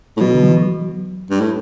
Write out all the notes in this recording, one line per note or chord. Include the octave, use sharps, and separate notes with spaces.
A2
B2 F#3
D3
F#3
E3
F#3
G2
A2